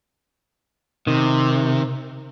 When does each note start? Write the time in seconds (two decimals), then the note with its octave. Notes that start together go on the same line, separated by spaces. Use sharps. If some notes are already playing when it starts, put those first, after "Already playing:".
1.07 C3 D#3